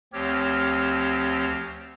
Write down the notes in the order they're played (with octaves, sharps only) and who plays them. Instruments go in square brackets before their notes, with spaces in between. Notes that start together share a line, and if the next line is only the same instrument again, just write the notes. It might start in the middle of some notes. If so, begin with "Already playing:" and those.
[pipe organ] D2 F3 C4 G4 C#5 F6